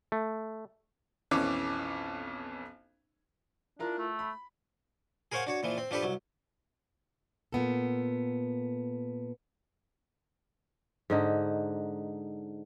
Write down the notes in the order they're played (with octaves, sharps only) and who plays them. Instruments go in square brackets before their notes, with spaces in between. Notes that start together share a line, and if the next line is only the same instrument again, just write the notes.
[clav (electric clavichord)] A3
[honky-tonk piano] B1 F2 E3 C#4 D6
[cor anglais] D4 [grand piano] E4 F4 A#4
[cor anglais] A3
[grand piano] B5
[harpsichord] G#4 A#4 C5 C#5 F5 F#5
D4 F#4 C#5
A#2 E3 F3
C4
F3 D4 G4 A4 B4
C2 F#3
[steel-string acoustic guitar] A#2 B3 A4
[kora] G#2 D3 D#4